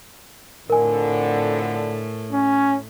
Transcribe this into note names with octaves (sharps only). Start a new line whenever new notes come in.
F2 A2 D3 A#4 G#5
C#4